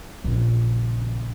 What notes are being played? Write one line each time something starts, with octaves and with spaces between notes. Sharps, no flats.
A#1 C#3